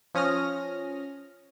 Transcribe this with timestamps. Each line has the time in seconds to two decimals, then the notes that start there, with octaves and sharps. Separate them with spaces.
0.14 F3 C#4 D#6 F6 A#6